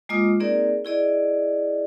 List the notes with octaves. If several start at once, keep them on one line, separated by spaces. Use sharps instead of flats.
G#3 A#3 F4 D#5 D6 D#6
A#3 C4 D#4 G#4 A#4 D5
E4 G#4 D5 D#5